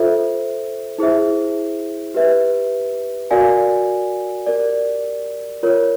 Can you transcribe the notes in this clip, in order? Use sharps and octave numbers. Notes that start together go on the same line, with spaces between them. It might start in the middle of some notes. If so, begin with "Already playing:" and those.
Already playing: F4 A4 C5 E5
E4 G#4 C5 E5
G4 B4 E5
F#4 A#4 D5 F5 G#5
G4 A#4 D5
F4 A#4 C#5